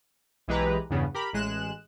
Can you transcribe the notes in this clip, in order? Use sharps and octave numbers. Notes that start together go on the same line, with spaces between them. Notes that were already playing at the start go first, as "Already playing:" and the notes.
B1 E3 G#3 G4 B4 A#5
E2 G2 C#3 B3
G4 A#4 B5
A1 G#3 F#6 E7